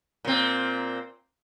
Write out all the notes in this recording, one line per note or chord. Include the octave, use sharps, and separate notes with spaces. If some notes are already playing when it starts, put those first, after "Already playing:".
A#2 C4